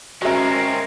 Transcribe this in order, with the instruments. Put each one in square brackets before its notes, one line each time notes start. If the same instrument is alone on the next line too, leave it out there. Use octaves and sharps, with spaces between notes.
[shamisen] F#3 E5 [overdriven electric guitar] G#3 C4 [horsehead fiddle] C#4 A#4